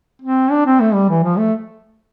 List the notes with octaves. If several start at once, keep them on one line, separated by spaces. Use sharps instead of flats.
C4
D4
C4
A3
G3
E3
F3
A3